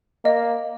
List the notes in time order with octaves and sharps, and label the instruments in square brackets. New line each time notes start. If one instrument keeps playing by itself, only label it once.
[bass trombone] A#3 [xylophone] D#5